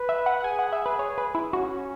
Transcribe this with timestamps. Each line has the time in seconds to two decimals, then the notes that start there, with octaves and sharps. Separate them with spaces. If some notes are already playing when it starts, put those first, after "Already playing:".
Already playing: B4
0.09 E5
0.26 F#5
0.41 F#5
0.44 G#4 G#5
0.59 F#5
0.73 E5
0.86 B4
0.99 C#5
1.18 B4
1.35 E4
1.53 C#4 F#4